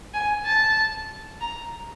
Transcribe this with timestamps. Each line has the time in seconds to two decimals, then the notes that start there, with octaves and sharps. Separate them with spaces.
0.14 G#5
0.45 A5
1.41 A#5